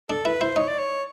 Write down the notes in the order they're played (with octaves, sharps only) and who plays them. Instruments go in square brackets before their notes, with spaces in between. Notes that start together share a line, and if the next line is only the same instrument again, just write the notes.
[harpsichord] D4 [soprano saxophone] A4
[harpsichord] E4 [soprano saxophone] B4
[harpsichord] E4 [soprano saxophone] C5
[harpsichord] D#4 [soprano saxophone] C#5
[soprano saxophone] D5
C#5